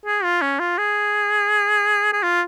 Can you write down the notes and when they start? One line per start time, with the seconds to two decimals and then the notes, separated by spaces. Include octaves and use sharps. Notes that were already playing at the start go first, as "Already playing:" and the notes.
0.06 G#4
0.24 F4
0.42 C#4
0.59 F4
0.78 G#4
2.13 G#4
2.23 F4